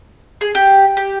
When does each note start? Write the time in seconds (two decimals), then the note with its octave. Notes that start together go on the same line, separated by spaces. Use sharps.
0.41 G#4
0.55 G4
0.97 G4